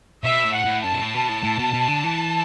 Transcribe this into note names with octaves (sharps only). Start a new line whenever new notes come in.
B2 E5
A2
F#5
A2
F#2 A5
B2
A2
B2
A2
A2
B2
B2
D3
E3